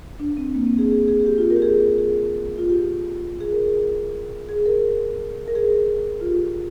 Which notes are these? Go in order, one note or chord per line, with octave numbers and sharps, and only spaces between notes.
D4
C4
A#3
C4
G#4
G#4
G#4
G#4
G4
F4
A#4
G4
G#4
G#4
F4
G4
G#4
A#4
G#4
G#4
A#4
A#4
G#4
F4
G4